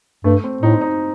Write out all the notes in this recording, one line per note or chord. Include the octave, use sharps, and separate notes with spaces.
G2 A3
C4
A2 D#4
C4
D#4